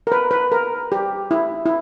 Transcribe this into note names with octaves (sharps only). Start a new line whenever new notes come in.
A#4
B4
B4
A#4
G4
E4
E4